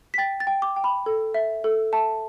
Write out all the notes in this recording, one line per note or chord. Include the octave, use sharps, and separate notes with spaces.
B6
G5 A6
A6
G5
D6
G5
B5
A4
E5
A4
E5 A5